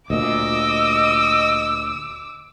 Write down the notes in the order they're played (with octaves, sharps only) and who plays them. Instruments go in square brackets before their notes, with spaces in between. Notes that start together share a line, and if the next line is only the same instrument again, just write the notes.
[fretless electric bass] D2 A#2 [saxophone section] D#5 [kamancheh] D6 E6